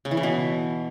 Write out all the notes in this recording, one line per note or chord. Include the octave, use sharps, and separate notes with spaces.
C#3
E3
C#3
B2